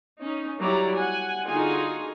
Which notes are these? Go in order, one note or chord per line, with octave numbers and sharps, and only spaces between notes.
C#4 D#4
F#3 G3 E4 D5 A#5
F#5 G#5
D3 D#4 F4 F#4 G#4 G#5